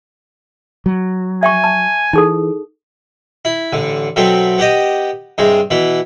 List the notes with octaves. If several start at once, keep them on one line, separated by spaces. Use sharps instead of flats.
F#3
E5 G5 G#5 C#6
A5
E3 D#4 G#4 A4
E4
A1 D3
B2 F#3 A3 C4
B3 G4 D#5
G2 C3 G#3
B2 E3 B3